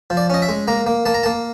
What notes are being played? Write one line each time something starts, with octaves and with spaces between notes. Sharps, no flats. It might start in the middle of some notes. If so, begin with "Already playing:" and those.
F3
D5
C#4 D#5
E5
G#3
A#3 A#5
A#3
A#3 A5
A#5
A#3 A5